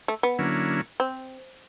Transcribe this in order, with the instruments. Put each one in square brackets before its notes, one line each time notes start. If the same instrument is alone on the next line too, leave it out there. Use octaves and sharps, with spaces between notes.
[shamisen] A3
B3
[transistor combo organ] D3 F#3 A#3 C#4 E4
[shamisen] C4